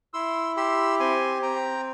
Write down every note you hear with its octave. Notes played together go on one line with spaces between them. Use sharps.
E4 C6 E6
G4 C6 E6
C4 G#5 C6
C4 G5 A#5